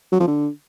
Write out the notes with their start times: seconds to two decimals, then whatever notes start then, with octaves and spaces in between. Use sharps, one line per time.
0.12 F#3
0.20 F3
0.27 D3